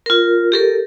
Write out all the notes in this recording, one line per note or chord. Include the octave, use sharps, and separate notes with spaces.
F4 A#4
G4 A4 A#4